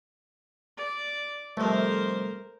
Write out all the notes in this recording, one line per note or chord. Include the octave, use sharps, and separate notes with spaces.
D5
C2 F2 A3 A#4 C5